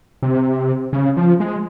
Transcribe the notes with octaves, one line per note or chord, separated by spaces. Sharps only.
C3
C#3
F3
G#3